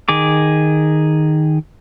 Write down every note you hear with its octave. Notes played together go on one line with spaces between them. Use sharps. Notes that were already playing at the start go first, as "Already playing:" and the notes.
D#3 G#4 D6